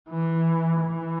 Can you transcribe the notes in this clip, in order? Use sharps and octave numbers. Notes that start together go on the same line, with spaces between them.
E3
E3